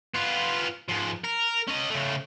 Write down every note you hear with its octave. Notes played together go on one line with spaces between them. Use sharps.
B3 F4
G#2 F3
A#4
C#4 D#5
C#3 A3